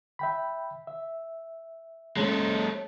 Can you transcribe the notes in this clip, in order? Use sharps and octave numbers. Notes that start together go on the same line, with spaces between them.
E5 G5 B5
E5
G#3 C#4 A4 C5 C#5 A5 A#5